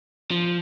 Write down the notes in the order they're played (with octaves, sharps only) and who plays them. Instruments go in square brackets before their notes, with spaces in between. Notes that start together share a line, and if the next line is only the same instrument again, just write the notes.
[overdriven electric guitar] F3